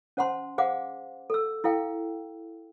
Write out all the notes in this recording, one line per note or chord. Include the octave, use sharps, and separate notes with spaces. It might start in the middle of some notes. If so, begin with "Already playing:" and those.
C#4 C5 F#5 A5 C6
G#4 C5 F5 F#5 D6
A4 E6
E4 A4 F5 G5